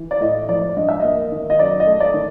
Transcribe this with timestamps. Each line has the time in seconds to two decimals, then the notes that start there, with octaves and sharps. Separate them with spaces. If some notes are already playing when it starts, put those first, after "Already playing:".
Already playing: E3
0.11 D5
0.21 A2 D#5
0.49 F3 D5
0.77 G2 D#5
0.89 E5
1.00 A#3 D#5
1.32 D#3
1.50 D#5
1.59 F#2 D5
1.80 D#5
1.87 A3
2.00 D5
2.14 D#3